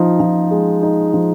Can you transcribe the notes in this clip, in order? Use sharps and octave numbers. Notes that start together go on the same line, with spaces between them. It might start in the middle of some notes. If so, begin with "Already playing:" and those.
Already playing: F3 D#4
F3
G#3
D#4
F3